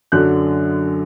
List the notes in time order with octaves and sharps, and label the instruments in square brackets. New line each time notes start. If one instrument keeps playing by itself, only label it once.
[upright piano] F#2 D3 F#3 F#6